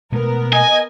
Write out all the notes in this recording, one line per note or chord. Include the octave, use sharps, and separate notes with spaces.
B2 G#3 A3 B3 A#4
D#5 G#5